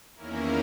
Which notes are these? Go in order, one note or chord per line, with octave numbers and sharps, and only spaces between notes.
E2 D#3 A#3 C#4 E4 A#4